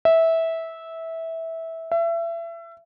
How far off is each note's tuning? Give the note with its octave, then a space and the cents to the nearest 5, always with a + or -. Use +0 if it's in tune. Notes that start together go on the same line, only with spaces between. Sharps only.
E5 -15
E5 +30